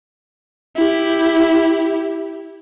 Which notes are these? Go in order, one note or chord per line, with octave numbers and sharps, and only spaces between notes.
E4 G4